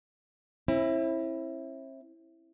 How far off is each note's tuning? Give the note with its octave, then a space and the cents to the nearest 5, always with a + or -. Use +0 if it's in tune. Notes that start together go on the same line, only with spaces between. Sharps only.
C4 +45 E4 +0